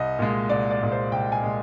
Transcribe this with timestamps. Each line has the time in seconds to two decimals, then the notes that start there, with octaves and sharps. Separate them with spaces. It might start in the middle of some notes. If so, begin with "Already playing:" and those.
Already playing: C2 D#5
0.19 A#2 G#3
0.50 C2 D5
0.70 D5
0.81 A#2 G#3
0.92 C5
1.12 C2 G5
1.32 G#5
1.43 A#2 G#3